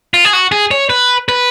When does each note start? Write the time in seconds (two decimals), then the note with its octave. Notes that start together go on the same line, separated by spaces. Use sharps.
0.14 F4
0.25 G#4
0.33 F#4
0.52 G#4
0.71 C#5
0.90 B4
1.29 B4